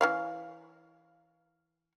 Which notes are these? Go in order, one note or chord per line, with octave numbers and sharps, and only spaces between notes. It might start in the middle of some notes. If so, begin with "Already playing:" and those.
E3 C#4 F5